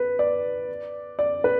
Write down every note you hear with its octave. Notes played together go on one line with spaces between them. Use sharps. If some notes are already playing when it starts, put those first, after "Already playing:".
Already playing: B4
D5
D5
B4